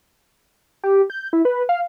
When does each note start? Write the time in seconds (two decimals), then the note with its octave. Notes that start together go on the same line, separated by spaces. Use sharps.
0.83 G4
1.10 G6
1.33 E4
1.45 B4
1.69 F5